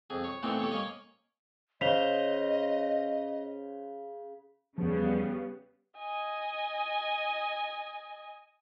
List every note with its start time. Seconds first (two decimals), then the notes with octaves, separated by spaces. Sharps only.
0.10 F2 G#4
0.24 C#5
0.43 A#2 E3 A3 B3 C4 D#4
0.59 G4 A4 C#5
0.71 A#3 C#4 C#5 D#5 F5
1.81 C#3 C5 D#5 B6 F7 G7
4.78 E2 C#3 F3 G3 B3
5.98 D#5 G#5